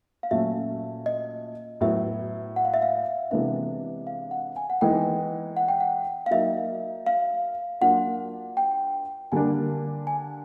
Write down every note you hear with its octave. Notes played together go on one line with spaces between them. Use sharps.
F5
A#2 F#3 A3 C#4 E5
D#5
A2 F#3 B3 E5
F#5
F5
E5
F5
C3 E3 G#3 B3 D4 E5
F5
F#5
G#5
F#5
E3 G#3 B3 D#4 G5
F#5
G5
F#5
F5
F#3 A#3 D#4 E5
F5
F#3 A#3 D4 F4 F#5
G5
D3 G3 A#3 D4 G#5
G#5